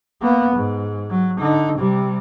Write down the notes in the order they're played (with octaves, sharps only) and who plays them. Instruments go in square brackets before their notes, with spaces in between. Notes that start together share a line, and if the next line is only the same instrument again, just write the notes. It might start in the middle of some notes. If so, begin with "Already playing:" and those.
[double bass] A#3 B3
G#2
F#3
D3 D#4
C3 G3